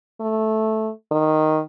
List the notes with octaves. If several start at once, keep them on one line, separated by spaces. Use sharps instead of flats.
A3
D#3